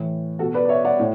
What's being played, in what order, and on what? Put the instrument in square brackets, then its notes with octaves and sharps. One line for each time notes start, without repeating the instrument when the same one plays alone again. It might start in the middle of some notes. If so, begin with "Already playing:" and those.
Already playing: [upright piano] A2 E3
B2 F#4 A4
B4 D5
D5
C#5 E5
D5 F#5
A2